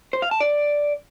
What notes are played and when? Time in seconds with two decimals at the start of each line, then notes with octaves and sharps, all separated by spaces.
0.13 C5
0.22 F5
0.31 A5
0.40 D5